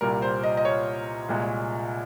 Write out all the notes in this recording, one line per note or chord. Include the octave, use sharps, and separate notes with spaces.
C2 A#2 G3 A#4
C5
D#5
D#5
C#5
C2 A#2 G#3